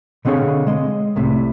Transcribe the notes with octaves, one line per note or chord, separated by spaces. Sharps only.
B2 D3 C4 G#4 C#5 F5
G#3 D#5
C2 A2 C3